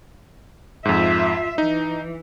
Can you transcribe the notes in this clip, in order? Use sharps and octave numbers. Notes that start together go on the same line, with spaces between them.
F2 G#2 F4 E5
E3 D#4